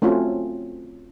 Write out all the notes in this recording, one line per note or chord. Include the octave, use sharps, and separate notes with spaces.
A3 C4 C#4 F4 F#4 A4